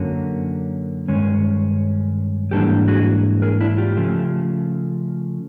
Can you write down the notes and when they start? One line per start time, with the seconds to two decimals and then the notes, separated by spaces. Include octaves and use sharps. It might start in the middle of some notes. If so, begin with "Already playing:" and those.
Already playing: F#2 D3 F#3 A#3 C#4
1.08 G2 D#3 G#3 C#4
2.51 G#2 E3 G3 A#3 D4 G4 A4
2.88 F#4 G#4
3.42 G#4 A#4
3.61 D4 E4
3.78 F4 G4
3.96 C#3 F3 A3